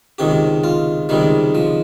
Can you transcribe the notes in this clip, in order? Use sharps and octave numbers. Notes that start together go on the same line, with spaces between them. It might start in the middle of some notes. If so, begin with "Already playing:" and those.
C#2 C3 D#3 G4
F4
C#2 C3 D#3 G3
F3